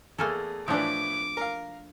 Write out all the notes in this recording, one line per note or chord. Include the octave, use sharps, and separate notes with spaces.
E2 A3 A#3 G#4 A4 G#5 F6
A2 E3 F3 D4 D6
A#4 F5